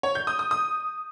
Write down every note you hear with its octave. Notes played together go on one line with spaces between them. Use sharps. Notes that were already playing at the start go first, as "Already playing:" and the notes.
C#5
G6
D#6
D#6
D#6